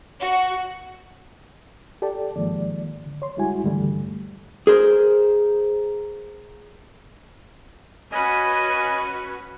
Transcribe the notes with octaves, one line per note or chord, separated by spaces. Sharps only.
F#4
G4 A4 D5 G5 A5
G#2 D#3 F3 G#3 A#3 D5
D3
C#5 C6
C#2 G3 G#3 E4 F#4 G#5
C#2 G2 D3 E3 G3 A3
G#4 A#4 C5
C#4 F#4 B4 D#5 G#5